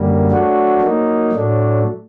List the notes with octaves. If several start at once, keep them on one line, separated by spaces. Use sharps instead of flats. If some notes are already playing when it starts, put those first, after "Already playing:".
Already playing: F#2 D3 G3 A#3
F#3 A3 D4 F#4
F#3 A#3 D#4
A2 F#3 A3 D4